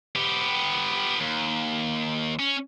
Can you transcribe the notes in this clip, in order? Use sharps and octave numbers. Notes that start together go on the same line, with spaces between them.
B3 G4
D#2
C#4